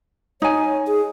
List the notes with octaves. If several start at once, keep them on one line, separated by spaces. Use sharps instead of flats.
D#4 C#5 G#5
G#4